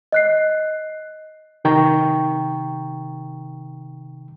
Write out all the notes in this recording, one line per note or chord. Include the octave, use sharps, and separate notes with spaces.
D#5 F#6 C7
C3 D#3 G5 A#5 C#6